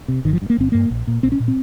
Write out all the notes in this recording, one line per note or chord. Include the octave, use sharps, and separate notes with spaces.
C3
G1 D#3
F3
G2
A#3
G1 C4
G2 A#3
A#1
A#2
A#1 C4
C#4
A#2
C4